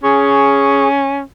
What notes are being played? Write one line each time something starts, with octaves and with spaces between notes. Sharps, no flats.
C#4 G#4 C#6